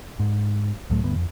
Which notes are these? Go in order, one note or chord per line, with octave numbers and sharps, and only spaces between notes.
G#2
C#2 A2 F#3 A3
D2 G2 B3
F2